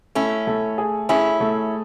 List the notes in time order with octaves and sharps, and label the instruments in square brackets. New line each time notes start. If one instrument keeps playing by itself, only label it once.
[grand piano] A3 [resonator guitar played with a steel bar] C#4 E4
[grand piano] A3
G#4
[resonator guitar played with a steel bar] C#4 E4 [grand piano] G#4
[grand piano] A3